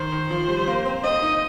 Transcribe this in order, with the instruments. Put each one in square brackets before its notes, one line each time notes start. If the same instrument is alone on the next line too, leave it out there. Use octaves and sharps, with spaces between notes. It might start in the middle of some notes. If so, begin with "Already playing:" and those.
Already playing: [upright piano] D#3 [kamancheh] C5
[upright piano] D#3
F3
G3
G3
A#3
C4
[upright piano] C4 [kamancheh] D#5
[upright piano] D#4